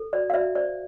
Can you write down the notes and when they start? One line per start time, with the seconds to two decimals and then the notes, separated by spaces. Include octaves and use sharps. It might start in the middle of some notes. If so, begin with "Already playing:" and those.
Already playing: A4
0.13 F#4 D5
0.30 F5
0.33 F#4 D5 E5
0.55 C5 D5